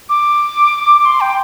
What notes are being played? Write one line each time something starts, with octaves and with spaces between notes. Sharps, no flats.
D6
D6
C6
G5